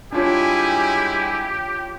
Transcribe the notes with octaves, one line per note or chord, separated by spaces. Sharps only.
G3 G#3 D4 E4 F4 G4 C#5 G#5